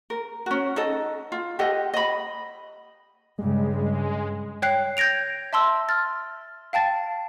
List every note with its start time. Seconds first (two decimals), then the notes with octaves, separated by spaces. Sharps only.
0.10 A#4
0.46 C#4 F#4
0.76 D#4 A4 D#5
1.32 F4
1.59 G4 A4 D#5 F#5
1.94 D#5 B5
3.39 G2 C#3 G#3
4.62 C#5 G5 F#6 C7
4.97 G6 G#6 A#6 D7 F7
5.53 E5 A5 C6 E6
5.89 F6 A6
6.73 F5 G5 A5 A6